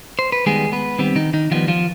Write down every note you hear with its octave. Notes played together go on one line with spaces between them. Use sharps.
C5
B4
D#3 G3 G#3 B3 G#4
B3 B4
D#3 G3 B3 C4
D#3 D#4
D#3 D#4
D#3 F3 G3 B3 F4
F3 F4